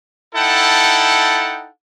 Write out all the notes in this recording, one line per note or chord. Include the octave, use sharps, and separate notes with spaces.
D#4 E4 A4 F#5 G5 A5